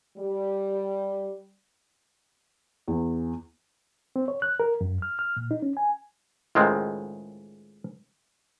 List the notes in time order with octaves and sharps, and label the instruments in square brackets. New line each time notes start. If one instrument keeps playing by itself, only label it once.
[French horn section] G3
[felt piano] E2
[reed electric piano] C4
C#5
F#6
A#4
F#2
F6
F6
A#2
D#4
C#4
G#5
[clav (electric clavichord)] C#2 A2 D#3 G#3 C4